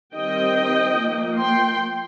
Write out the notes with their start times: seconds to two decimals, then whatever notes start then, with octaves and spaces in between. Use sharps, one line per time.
0.15 D#3 G3 C4 D#5 G5
0.98 F3 A#3
1.40 G5 C6